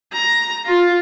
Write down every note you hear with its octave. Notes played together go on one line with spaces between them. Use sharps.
A#5
F4